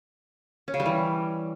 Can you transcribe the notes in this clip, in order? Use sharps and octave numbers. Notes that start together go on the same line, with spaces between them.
C#4
C#3
G3
E3